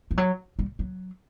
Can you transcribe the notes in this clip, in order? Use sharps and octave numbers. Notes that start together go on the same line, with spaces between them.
F3
F#3
G3
F#3